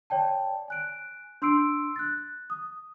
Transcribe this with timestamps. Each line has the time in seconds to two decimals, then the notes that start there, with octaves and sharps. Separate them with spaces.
0.10 C#5 D5 G5 A5
0.68 G#5 F#6 D7
1.42 D4 C6 E6 C7 D7
1.96 F#6 A6
2.50 D#6